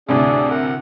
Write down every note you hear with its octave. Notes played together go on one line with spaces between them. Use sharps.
D2 A2 C3 D4 G#4
A#4 F#5